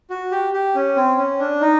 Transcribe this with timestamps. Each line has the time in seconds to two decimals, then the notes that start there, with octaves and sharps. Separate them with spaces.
0.10 F#4
0.31 G4
0.53 G4
0.75 C#4
0.96 C4
1.18 C#4
1.39 D4
1.61 D#4